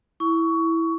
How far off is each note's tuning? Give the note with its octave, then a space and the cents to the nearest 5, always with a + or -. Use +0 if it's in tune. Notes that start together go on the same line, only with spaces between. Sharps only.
E4 -5 C#6 +20